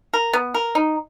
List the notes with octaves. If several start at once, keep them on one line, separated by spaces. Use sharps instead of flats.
A#4
B3
A#4
D#4